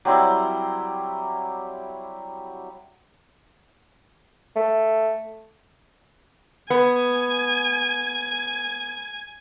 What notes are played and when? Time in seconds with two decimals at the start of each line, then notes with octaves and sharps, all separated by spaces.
0.05 F#3 G3 C4 E4
4.56 A3
6.70 B3 G#5